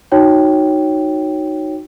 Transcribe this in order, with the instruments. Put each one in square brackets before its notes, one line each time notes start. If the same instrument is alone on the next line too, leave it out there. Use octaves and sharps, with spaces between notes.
[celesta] D#4 F#4 C#5 G5